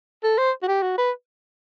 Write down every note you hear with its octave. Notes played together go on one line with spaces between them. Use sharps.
A4
C5
F#4
G4
F#4
B4